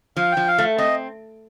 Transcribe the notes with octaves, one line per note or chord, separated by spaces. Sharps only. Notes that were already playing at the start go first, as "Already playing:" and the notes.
F3 F5
G5
F3
F5
A3
C4 D#5